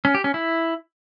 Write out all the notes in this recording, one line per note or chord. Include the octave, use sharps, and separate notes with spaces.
C#4
G4
C#4
E4